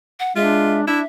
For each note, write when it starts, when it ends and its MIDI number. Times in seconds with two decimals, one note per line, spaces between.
0.20 0.35 78
0.36 0.85 56
0.36 0.86 62
0.36 0.80 65
0.36 0.81 76
0.87 1.02 62
0.87 1.00 64
0.87 1.06 76